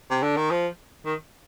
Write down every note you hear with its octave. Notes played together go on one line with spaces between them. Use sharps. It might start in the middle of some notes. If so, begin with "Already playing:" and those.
C3
D3
D#3
F3
D#3